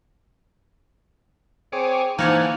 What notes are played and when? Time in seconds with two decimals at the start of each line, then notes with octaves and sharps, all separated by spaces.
1.72 C4 G#4 C#5 D6
2.19 E3 F3 A#3 D#4 C#5 D5 F#5 G#5